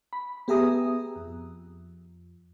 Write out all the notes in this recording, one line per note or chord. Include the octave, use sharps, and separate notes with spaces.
B5
B3 G4 G#4 E5 A#5 D#6
F2